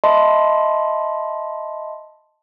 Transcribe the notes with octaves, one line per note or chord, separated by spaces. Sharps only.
D#5 E5 A5 B5 C6